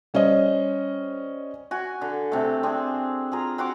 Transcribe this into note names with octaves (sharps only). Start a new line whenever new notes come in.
G3 C#4 C5 D#5
F#4 G#5
D3
C3 A3
C4 D4 G#4
F4 G#4 A#5
C4 F#4 C6 D6